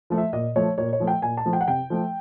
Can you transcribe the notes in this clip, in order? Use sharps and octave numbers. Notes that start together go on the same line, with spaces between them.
F3 A3
E5
A#2 D#5
F3 A3 C#5
A#2 C#5
C#5
F3 A3
G5
A#2 G#5
A5
F3 A3
G5
F#5
C3 G5
F3 A3